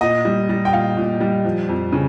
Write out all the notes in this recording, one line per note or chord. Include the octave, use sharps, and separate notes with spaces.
A#2 D#5
G3
G3
G5
A#2 F5
A#2
G3
F3
F2
C#3